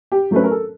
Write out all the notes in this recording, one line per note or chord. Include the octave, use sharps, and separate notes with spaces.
G4
F#3 A3 C#4 B4
A#4
A4